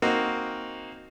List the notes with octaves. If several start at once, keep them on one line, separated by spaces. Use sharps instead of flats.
A#3 C4 D#4 F#4